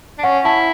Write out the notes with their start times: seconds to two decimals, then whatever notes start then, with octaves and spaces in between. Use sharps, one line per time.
0.18 D4
0.23 C#4 F#5
0.45 E4 A5